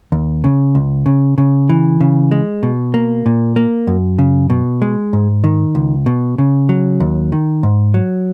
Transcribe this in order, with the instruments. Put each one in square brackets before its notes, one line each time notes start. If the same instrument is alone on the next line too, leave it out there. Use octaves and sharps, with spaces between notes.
[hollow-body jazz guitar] D#2
C#3
C#2
C#3
C#3
E3
C#3
G#3
B2
A#3
A#2
A#3
F#2
C#3
B2
G#3
G#2
D#3
C#2
B2
C#3
F#3
D#2
D#3
G#2
F#3